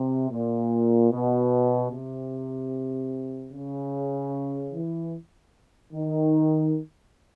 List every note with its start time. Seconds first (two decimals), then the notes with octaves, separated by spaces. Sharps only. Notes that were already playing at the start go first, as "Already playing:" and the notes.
Already playing: C3
0.31 A#2
1.11 B2
1.92 C3
3.52 C#3
4.72 E3
5.93 D#3